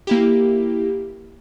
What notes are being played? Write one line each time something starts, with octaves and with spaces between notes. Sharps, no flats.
A#3 E4 G4